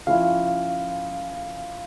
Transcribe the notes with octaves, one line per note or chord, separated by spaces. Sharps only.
C#3 F3 C#4 E4 F5